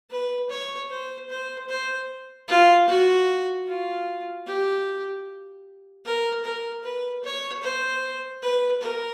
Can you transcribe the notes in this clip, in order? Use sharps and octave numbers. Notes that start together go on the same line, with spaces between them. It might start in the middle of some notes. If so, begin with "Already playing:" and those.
B4
C#5
C5
C5
C5
F4
F#4
F4
G4
A#4
A#4
B4
C#5
C5
B4
A#4